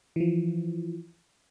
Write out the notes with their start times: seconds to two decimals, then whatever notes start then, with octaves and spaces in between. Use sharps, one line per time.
0.16 E3 F3